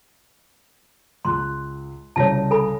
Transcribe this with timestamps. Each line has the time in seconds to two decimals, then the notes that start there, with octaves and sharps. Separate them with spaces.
1.25 C#2 C6 F#6
2.16 C2 C#3 C#5 A5 A#6
2.51 A4 G#5 B5